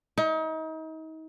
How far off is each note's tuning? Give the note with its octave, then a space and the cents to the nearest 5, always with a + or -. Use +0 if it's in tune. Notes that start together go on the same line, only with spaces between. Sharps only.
D#4 +35